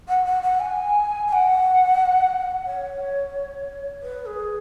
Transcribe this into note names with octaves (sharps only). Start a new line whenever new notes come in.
F#5
F#5
F#5
G#5
G#5
F#5
C#5
B4
G#4